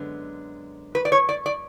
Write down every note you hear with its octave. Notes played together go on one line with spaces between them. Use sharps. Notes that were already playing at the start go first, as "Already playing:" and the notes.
Already playing: F#2 D3 G#3 B3
B4
D5
C#5
D5
D5